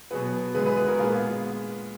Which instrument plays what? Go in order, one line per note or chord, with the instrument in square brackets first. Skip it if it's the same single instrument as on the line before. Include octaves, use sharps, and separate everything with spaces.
[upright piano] B2 F#3 B3 G#4 B4
D3 G#3 B3 G#4 B4
G#4 B4
G#4 B4
F#4 A#4
A#2 G#3 B3 F4 G#4